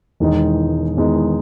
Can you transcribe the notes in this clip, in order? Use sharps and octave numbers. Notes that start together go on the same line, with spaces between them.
E1 E2 D#3 G#3 D#4
E1 E2 D#3 G#3 D#4